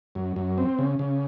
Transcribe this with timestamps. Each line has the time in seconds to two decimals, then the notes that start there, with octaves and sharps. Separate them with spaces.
0.15 F#2
0.36 F#2
0.58 C4
0.79 C#3
0.99 C#3